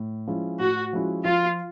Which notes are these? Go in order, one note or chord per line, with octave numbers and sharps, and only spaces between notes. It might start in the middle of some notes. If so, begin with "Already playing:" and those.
Already playing: A2
F3 G#3 C#4 E4
A2 F#4
F3 G#3 C#4 E4
F3 F4